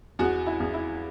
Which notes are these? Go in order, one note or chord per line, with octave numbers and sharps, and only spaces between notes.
E2 F#4
E4
E2
E4